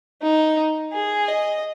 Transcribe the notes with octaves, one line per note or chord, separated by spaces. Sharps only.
D#4
G#4
D#5